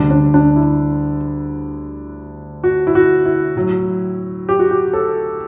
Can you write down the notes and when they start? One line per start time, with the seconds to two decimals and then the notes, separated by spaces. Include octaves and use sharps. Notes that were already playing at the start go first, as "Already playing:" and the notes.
Already playing: D2 D3 G3 D4
0.11 D4
0.34 D4
0.56 E4
2.64 F#4
2.87 E4
2.95 F#4
3.26 E4
3.56 A2 F#3
4.49 G4
4.59 F#4
4.71 G4
4.93 A4